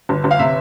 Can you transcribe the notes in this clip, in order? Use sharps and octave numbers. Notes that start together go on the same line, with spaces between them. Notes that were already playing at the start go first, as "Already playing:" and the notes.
G1
G1
F5
C3 E5